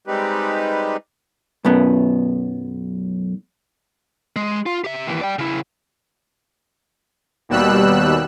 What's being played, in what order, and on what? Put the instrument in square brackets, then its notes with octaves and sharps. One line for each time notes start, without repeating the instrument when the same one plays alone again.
[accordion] G3 G#3 C4 D#4 G4 B4
[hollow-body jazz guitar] B1 F#2 B3
[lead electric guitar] G#3
F4
G4 E5
D#2 E3
D5 G5
C#3 E4
[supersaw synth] D#2 B2 G3 E6 F#6